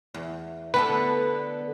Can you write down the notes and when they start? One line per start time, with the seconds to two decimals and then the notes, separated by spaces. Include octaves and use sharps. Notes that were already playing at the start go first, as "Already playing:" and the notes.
0.14 E2
0.74 D3 B3 A4 B4